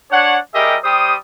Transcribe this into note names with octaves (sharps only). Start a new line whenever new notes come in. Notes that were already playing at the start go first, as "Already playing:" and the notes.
D4 C#5 F#5
G3 G4 G#4 A#4 D#5 E5
G3 G4 C5 D#6